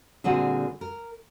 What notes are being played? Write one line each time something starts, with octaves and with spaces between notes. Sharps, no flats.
A#2 D3 G3 C4 F#4 G#4
A#4